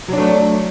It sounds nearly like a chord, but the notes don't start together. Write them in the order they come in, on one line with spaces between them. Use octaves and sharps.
F#3 D4 A3